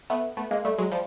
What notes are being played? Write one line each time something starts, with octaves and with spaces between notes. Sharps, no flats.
A3 B3
A3 B3
G#3 A#3
G3 A3
F#3 G#3
F3 G3